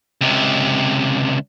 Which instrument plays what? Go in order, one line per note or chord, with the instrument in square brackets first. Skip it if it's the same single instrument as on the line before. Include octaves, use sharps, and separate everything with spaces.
[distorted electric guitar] C#2 C3